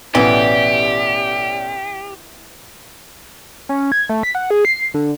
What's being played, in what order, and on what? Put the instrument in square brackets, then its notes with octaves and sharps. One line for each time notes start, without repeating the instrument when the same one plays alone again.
[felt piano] A1 B2 [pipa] E3 B3 [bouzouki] G3 C#4 A4 [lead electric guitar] G4
[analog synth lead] C#4
G#6
A3
B6
F#5
G#4
C7
D3